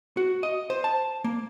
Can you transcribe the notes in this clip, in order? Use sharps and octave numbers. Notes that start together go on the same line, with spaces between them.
F#4
D#5
C5
A5
A#3